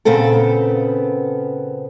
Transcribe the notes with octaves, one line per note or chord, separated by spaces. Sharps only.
A#2 C#3 B3 C4 A4